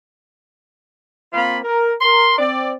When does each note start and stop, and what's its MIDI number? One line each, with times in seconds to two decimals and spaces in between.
1.32 1.57 58
1.32 1.57 60
1.32 1.57 65
1.32 1.57 77
1.32 1.57 83
1.63 1.93 70
2.01 2.37 70
2.01 2.37 84
2.37 2.70 60
2.37 2.70 74